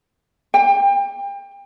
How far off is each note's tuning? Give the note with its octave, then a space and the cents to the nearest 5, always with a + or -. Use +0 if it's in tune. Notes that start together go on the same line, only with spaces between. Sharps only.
G5 +30